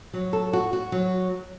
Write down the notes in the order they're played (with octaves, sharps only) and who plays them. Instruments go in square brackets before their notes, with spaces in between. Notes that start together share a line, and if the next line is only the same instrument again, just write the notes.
[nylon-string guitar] F#3
A4
F#4
F#4
F#3